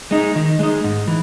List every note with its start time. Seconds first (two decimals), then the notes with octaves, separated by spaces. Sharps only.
0.11 G#3 D#4
0.36 D#3
0.59 G#3 D#4
0.84 G#2
1.08 E3